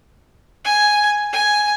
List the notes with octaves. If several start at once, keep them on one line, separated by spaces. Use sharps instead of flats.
G#5
G#5